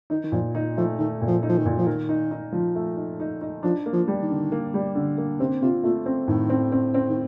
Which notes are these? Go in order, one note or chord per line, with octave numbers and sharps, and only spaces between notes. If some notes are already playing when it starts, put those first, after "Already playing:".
D#3 D#4
D#3
A#2 F3
D#3 D#4
F3 A3
D#3 A3
A#2
F3
D#4
F3
D#3
A#2
F3
D#3 A#4
D#4
D#4
F3
A3
D#4
D#4
D#4
F3 D4
A#3
F3
G3
D#3
D3
A#3
G3
D3
A#3
C3 C4
C3 F4
A#2 A3
C4
A2 D#3
C4
C4
C4
D#3